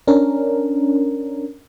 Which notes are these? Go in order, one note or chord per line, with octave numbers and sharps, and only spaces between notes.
C#4 D4 A#4